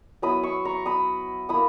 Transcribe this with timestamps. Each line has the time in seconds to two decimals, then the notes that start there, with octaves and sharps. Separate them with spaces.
0.22 F#3 B3 E4 B5 D#6
0.43 C#6 E6
0.65 A#5 C#6
0.86 B5 D#6
1.49 A#3 E4 B5 D#6